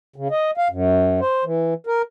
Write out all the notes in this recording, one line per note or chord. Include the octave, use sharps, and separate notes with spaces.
C#3
D#5
F5
F#2
C5
E3
A#4